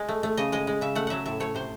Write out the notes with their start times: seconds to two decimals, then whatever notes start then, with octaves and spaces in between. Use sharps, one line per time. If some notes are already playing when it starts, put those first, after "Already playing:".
Already playing: G#3 G#4
0.09 A3
0.23 A3
0.37 C#3 D#5
0.52 G#3 D#5
0.67 G#3
0.81 C#3 E5
0.95 A3 F#5
1.07 F#3 E5 F#5
1.25 A2 E5
1.40 A3 C#5
1.55 C3 C5